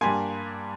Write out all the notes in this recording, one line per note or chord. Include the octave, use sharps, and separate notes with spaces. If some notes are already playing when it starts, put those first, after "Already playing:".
G2 G3 A#3 G#5 C6